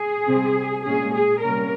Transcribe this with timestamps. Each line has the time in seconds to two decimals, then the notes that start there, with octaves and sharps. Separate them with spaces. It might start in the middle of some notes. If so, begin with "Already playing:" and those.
Already playing: G#4
0.27 C3 G3 C4
0.84 A#2 G#3 C#4 G#4
1.13 G#4
1.41 C3 G3 A#3 C#4 A#4